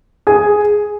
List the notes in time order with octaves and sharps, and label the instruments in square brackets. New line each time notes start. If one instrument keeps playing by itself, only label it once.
[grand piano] G#4 G#5